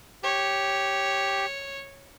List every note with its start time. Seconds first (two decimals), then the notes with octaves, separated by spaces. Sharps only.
0.23 G4 C#5